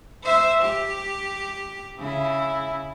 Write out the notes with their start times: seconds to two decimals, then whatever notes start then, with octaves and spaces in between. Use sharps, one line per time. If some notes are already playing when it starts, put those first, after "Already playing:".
0.24 C5 E5
0.62 G4
1.98 C#3 E4